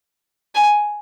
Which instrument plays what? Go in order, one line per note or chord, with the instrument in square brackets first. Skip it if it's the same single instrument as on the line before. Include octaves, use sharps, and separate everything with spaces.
[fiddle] G#5